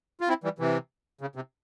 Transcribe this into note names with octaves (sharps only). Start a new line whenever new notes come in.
F4
C4 E4
E3 G3
C3 E3
C#3
C3